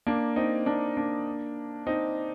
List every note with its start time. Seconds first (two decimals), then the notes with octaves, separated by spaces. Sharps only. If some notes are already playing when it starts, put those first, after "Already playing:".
0.07 A#3 D4
0.36 C4 D#4
0.66 A#3 D4
0.97 A#3 D4
1.87 C4 D#4